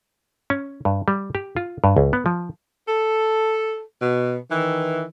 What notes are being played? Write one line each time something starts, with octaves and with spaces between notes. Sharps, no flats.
C#4
G2
G3
G4
F4
G2
C#2
B3
F3
A4
B2
D#3 E3